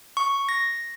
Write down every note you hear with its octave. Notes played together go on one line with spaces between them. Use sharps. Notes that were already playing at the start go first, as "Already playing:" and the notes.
C#6
A#6